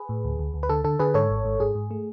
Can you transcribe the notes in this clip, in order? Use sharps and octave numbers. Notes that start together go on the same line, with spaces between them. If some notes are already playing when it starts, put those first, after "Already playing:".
Already playing: G#4 B4
A2
D2
D2
D2
B4
D3 A4
D3 A4
D3 G#4 B4
G#2 A4 C#5
G#1
G#2
G#2 G#4
G#2
A3